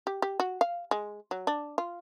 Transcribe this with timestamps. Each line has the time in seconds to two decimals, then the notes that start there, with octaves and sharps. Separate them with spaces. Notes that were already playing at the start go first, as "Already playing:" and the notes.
0.07 G4
0.22 G4
0.40 F#4
0.61 F5
0.91 G#3
1.31 F#3
1.47 D4
1.78 F4